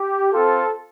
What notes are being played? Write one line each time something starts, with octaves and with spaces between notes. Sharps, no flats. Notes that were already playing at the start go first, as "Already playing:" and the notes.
Already playing: G4
C4 F4 A4